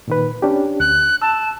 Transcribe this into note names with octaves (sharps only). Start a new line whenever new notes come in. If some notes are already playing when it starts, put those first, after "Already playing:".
A#2 D#3 B4
C#4 D4 G4
D2 F#6
A5 E6